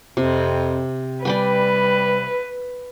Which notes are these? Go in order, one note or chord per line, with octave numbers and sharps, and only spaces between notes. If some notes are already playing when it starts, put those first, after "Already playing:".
F2 C3
G3 B4 D5 G5 G#5